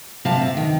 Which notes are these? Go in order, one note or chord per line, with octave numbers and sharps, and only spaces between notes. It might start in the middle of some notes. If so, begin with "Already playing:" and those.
C3 F5 A5
C3
D#3